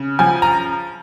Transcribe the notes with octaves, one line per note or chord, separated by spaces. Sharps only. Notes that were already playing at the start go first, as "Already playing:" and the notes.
Already playing: C#3
F3 G#5
A#5